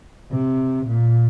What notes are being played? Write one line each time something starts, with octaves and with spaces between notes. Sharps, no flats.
C3
A#2